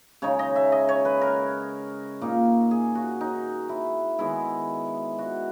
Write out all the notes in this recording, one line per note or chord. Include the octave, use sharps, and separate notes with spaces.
C#3 G#3 D#4 C#5
D#5
E5
D#5
C#5
B4
A#4
A#2 A#3 D#4
G#4
F#4
D#4
E4
D#3 G#3 B3 E4
F#4